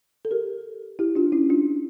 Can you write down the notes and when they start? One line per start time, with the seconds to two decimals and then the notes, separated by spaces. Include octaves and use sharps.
0.25 A4
0.31 G4 A#4
0.99 E4 G4
1.15 D4 F4
1.32 C#4 E4
1.49 D4 F4